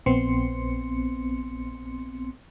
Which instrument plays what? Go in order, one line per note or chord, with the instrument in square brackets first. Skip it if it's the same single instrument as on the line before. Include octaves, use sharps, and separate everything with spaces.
[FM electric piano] A#1 B3 C4 C6 C#7